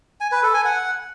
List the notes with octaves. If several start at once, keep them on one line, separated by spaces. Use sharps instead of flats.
G#5
B4
A4
G#5
F#5